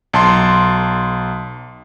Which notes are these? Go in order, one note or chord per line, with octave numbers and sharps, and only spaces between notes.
B1 A5 C6